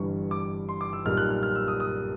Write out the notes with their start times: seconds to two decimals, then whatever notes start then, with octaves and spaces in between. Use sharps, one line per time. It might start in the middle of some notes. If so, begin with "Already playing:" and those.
Already playing: G1 G2 E3 G3 C#6
0.31 D6
0.69 C6
0.81 D6
0.93 E6
1.06 B1 A#2 G3 F6
1.17 F#6
1.30 F6
1.43 F6
1.56 E6
1.68 D#6
1.80 D#6